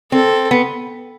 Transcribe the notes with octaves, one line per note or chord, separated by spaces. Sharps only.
C4 A4
B3